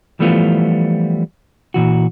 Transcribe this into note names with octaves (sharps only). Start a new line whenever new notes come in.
E3 F3 G3 A3 B3 F4
A#2 E3 F#4